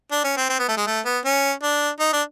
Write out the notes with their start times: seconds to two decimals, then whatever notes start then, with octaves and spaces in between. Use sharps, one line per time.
0.12 D4
0.24 C#4
0.37 C4
0.49 C4
0.59 B3
0.68 A3
0.77 G#3
0.87 A3
1.05 B3
1.25 C#4
1.63 D4
2.00 D#4
2.13 D4